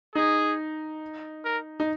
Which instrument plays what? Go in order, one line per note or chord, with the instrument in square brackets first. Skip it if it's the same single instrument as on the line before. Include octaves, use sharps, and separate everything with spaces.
[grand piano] D#4 [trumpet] G#4
[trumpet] A#4
[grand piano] D#4